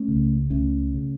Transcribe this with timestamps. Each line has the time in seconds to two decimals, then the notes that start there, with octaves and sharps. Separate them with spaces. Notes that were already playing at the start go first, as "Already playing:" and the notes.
Already playing: A3 C#4
0.08 C#2 C#3
0.50 C#2 C#3 A3 C#4
0.95 C#3